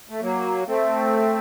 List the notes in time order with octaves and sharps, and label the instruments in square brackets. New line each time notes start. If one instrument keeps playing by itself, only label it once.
[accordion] A3
F#3 A#3
A3 C4